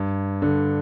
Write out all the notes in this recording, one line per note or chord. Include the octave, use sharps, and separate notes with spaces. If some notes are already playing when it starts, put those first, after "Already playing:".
Already playing: G2
D3